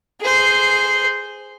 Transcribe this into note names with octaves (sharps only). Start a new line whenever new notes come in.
G#4 C5